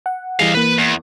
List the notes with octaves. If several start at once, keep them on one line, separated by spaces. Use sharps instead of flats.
F#5
E3 G3 G#4 D#5 F5
E3 A#3 B4
E2